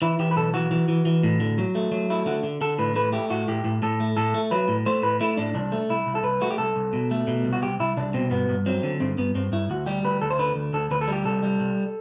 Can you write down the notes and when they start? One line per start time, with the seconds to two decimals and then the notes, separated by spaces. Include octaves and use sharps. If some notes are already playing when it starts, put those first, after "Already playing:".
0.02 E3 E4
0.19 E3 G4
0.31 B4
0.36 B1 A4
0.54 E3 F#4
0.71 E3
0.88 E3
1.05 E3
1.23 A2
1.40 D3
1.58 F#3
1.75 A3
1.92 F#3
2.10 A3 E4
2.26 D3 F#4
2.43 D3
2.61 D3 A4
2.79 A2 B4
2.96 A3 B4
3.13 A3 G4
3.30 A2 F#4
3.48 A2 G4
3.64 A2
3.82 A2 A4
4.00 A3
4.17 A2 A4
4.34 A3
4.51 F#3 B4
4.68 A2
4.86 A3 C5
5.03 A2 B4
5.21 A3 E4
5.37 A2 D4
5.54 C2 D4
5.72 A3
5.90 C2 E4
6.07 C2
6.15 A4
6.24 C2 B4
6.41 A3 F#4
6.51 G4
6.58 C2 A4
6.76 C2
6.93 B2
7.11 A3
7.27 B2
7.45 C2
7.53 F#4
7.62 C2 G4
7.80 C2 E4
7.97 C2 D4
8.14 B2 C4
8.31 G2 B3
8.49 G2
8.66 F#3 C4
8.83 D3
9.00 G2 C4
9.18 G2 B3
9.35 G2 C4
9.52 G2 E4
9.70 D2 F#4
9.86 G3 G4
10.04 D2 B4
10.22 D2 A4
10.31 C5
10.39 D3 B4
10.56 D2
10.73 D2 A4
10.91 D2 B4
11.01 A4
11.08 G3 G4
11.25 C2 A4
11.43 G3
11.60 C2